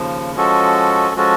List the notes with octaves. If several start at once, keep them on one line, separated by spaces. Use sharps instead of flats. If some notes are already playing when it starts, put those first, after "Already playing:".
Already playing: D#2 C#3 F3
F3 G#3 C#4 F#4 A4
F3 G#3 C#4 F#4 A4